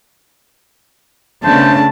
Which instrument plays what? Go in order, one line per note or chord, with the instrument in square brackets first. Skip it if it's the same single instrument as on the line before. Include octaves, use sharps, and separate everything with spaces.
[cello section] C#3 A3 B3 [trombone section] D4 [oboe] C5 [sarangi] A5